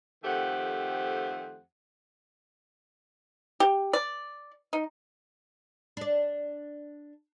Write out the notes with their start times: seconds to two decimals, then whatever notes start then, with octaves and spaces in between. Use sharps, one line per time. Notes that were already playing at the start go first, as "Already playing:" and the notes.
0.24 F2 D#3 A3 G4 C5 F#5
3.60 G4
3.93 D5
4.73 D#4
5.97 D4 D5